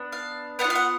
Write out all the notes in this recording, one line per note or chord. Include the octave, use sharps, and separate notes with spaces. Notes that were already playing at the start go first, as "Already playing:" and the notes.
Already playing: B3 D4
F5
B3 D4 F#5
F4
F5
F#5